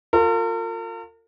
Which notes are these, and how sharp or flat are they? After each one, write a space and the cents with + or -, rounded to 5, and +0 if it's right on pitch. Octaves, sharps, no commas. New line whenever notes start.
F4 +20 A#4 -45